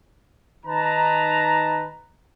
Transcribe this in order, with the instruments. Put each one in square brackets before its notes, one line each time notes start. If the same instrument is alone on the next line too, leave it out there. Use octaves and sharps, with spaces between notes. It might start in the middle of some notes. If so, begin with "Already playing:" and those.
[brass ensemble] D#3 D#4 B4 A5 A#5